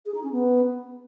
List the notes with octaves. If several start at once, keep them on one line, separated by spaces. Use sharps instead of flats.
G#4
D#4
C#4
B3